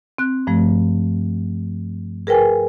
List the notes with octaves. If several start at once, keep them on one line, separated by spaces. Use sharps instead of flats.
C4 F#6
G2 F3 A3
G#4 A#4 B4 G5 G#5